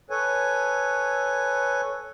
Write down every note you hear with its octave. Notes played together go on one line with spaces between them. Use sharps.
A4 B4 C#5 G#5